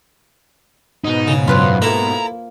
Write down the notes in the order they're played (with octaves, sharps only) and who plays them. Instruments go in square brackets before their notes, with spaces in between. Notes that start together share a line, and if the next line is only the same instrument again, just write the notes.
[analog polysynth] G#2 B2 [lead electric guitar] D#4
[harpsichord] C#3
[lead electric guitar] F#2 [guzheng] F4 B4 C5
[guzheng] A#3 [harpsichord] E4 A4 E5 [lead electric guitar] A#5